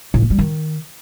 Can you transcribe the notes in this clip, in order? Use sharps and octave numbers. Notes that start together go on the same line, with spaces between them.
A2
A3
G3
D#3